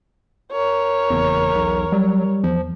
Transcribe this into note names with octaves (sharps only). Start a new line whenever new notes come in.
A#4 C#5
F#1 E2
B1
F#3 G3
E2 F3